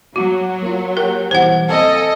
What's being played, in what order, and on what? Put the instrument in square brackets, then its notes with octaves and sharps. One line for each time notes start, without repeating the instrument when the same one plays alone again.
[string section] F#3 [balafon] F#4
[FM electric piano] A#3 F4
[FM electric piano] G4 F#5 G5 [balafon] A#4
[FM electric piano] B2 E3 G3 [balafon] C5 F#5
[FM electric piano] C4 F5 G#5 [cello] A4 [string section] D#5